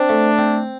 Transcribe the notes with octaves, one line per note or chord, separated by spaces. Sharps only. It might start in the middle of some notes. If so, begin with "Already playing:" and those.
Already playing: C4 D4
A3
C4